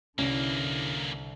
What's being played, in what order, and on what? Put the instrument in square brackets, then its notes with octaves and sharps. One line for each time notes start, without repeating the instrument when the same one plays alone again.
[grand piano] C2 [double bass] D3 [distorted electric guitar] E3 A#3 [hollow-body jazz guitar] C#4 E4